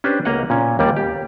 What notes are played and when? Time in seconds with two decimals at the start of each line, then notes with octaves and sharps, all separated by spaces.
0.04 C#4 D4 G4 B4 C5
0.25 C#2 A#3 C#5 D#5 F5 F#5
0.50 A#2 C#4
0.79 D#2 G3 A#3 D5
0.97 G4